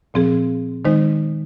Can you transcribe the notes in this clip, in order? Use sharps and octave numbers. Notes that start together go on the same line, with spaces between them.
A#2 F3 C4 G#4
D#3 G#3 D#4 C5